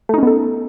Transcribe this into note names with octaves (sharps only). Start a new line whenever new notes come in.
A3 B3 C#4 D#4 A4